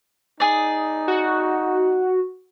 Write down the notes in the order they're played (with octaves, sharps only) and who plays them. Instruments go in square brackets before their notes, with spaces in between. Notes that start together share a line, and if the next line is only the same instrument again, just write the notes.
[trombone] D#4 [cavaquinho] G#4 D5
[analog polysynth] F#4